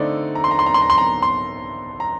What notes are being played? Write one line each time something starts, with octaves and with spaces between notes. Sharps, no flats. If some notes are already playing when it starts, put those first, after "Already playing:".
Already playing: D3 A3 C4 D#4 D5
A#5
C6
A#5
C6
A#5
C6
A#5
C6
A#5
C6
A#5